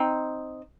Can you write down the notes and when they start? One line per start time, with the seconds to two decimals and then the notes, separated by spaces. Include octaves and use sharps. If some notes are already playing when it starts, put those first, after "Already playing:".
Already playing: C4 D#4